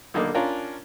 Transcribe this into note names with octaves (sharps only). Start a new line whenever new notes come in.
B1 D3 A#3 D#4
C#4 D4 F4 A#4